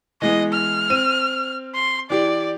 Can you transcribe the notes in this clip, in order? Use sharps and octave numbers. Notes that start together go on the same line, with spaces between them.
E3 G#3 B3 D#5
F6
C4 D#7
C6
E3 G4 D5